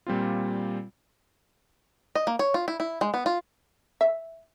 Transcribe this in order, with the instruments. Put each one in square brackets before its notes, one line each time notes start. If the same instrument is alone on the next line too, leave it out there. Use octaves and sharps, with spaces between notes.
[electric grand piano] A#2 G3 C4 F4
[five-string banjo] D#5
A#3
C#5
F4
E4
E4
G#3
B3
F4
[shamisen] E5